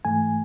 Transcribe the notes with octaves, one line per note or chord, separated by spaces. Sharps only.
G#2 E3 A3 G#5